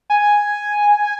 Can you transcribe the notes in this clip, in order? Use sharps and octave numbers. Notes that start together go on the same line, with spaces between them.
G#5